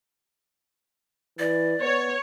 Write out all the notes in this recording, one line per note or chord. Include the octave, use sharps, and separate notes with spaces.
E3 D5
B3 C#5